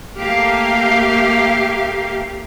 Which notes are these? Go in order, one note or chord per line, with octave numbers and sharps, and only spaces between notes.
A3 A#3 G4 F5